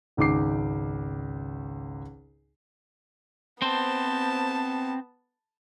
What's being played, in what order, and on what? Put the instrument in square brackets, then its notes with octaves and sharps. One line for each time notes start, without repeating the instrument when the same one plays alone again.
[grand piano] G#1 C#2 D#4 D6 C7
[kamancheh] B3 A5 [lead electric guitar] C4 C5